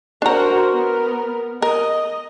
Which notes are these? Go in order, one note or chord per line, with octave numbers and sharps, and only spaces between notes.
D4 F#4 A#4 C5 A#5
B3 A#4
A#4 D#5